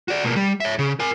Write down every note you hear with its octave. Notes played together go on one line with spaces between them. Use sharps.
F#4 D5
B2 A#3
G3
C#5 E5
C#3
A#4 G#5